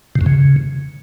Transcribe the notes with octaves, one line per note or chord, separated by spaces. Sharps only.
C3
F#2
C#3